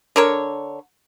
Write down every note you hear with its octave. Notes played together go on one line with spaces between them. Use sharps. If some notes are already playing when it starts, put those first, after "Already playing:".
D3 A#4 C#5